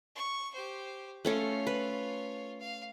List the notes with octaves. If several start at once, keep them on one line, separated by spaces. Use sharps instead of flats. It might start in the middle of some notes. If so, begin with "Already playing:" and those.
C#6
G4 C5
A3 C#4 F4 A4 C#5
B4
F5